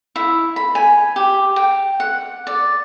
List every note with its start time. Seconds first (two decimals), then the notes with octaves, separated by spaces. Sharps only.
0.16 E4
0.56 B5
0.75 G#5
1.16 G4
1.56 G5
2.00 F#5
2.47 D5